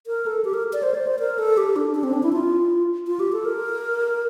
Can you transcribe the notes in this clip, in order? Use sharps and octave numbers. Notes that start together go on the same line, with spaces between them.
A#4
A4
G4
A#4
D5
C5
D5
C5
A#4
A4
G4
D4
D4
C4
D4
E4
F4
F4
G4
A4
A#4